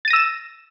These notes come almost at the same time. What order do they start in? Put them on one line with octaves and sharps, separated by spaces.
A6 D#7 A#6 E6 E7